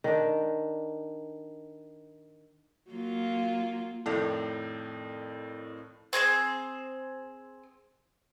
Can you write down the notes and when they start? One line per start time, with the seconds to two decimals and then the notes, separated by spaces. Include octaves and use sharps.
0.04 D#3 D4
2.91 F#3 A#3 F4
4.06 F2 A2 D#3 E4 A4 D5
6.13 C4 G#4 B4 C5